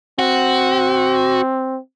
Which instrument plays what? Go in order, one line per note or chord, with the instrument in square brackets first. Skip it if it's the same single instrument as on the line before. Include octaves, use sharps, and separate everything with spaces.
[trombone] C4 [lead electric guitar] F#4